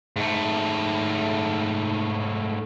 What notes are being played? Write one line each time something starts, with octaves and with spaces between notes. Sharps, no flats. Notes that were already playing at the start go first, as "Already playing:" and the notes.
G#2 A3